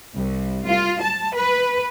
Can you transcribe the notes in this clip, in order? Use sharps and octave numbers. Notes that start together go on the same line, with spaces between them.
C2
F4
A5
B4